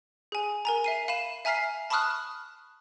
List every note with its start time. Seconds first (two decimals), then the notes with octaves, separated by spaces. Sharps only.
0.32 G#4 G#5
0.65 A#4 G#5 A#5
0.84 E5 C7 D#7
1.08 F5 B5 D#7 E7
1.45 E5 G#5 A#5 F6 B6 C7
1.90 A5 B5 C#6 D#6 F6 F#6